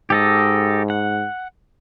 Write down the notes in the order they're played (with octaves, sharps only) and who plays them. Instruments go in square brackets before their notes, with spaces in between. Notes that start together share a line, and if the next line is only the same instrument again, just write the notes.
[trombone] G#2 [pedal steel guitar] G4 A4 D#5
[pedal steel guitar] F#5